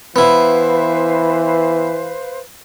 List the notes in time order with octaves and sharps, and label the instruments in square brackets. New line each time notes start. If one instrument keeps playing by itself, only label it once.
[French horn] E3 [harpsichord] B3 E4 [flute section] B4 C5 F5